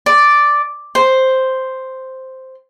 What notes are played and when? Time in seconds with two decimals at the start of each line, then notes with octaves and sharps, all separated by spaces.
0.06 D5
0.95 C5